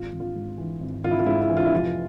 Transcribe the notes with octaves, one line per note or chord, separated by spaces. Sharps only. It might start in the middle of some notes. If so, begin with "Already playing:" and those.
Already playing: G#1 F4
G#1
F4
G#2
E3
G#1
G#1 F4
E4
F4
G#2 E4
E4
E3
F4
E4
F1 F4